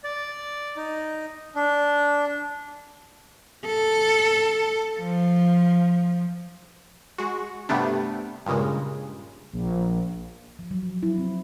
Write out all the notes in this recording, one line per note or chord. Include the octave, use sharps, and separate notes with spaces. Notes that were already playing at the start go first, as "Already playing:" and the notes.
D5
D#4
D4
A4
F3
G#3 F#4
G2 C3 G3 A3 B3 D4
G2 A#2 C#3 G#3
A#1
F3
F#3
E4
C4